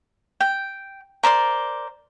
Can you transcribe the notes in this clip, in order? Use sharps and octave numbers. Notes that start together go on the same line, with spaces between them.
G5
A#4 C5 D5 C6